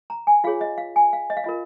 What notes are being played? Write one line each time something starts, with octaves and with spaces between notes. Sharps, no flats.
A#5
G#5
F4 G#4 C#5 F5
D#5
F5
G#5
F5
D#5
F5
F4 A#4 D#5